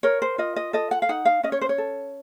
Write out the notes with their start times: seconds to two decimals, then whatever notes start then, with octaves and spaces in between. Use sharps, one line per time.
0.03 A#4 C#5
0.22 C5
0.38 F4 D#5
0.56 D#5
0.73 A4 D#5
0.91 F#5
1.02 F5
1.09 D#4 F#5
1.25 F5
1.43 C#4 D#5
1.52 C#5
1.61 C5
1.69 C#5
1.78 A4